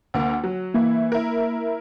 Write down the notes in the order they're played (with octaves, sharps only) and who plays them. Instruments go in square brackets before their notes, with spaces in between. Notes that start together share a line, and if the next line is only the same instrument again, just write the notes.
[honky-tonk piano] D2 A#3
F#3
[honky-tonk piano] E3 E4 [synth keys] A#3
[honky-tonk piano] E4 A#4